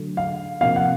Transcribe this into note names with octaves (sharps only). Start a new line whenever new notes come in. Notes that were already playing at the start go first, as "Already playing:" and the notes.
Already playing: D3 F#3 A3
F5
C3 F3 A#3 F5
F#5